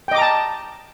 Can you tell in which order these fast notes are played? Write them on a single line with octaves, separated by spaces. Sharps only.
G5 D#5 D6 A#5 A5